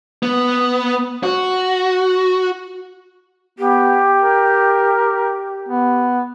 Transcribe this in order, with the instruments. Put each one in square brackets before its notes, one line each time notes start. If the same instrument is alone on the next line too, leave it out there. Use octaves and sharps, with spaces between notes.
[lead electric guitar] B3
F#4
[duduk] B3 [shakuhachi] G4
[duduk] A#4
B3